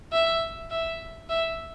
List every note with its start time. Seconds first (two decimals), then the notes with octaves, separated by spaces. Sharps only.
0.12 E5
0.71 E5
1.29 E5